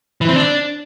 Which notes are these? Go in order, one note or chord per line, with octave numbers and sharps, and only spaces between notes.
E3
C4
D4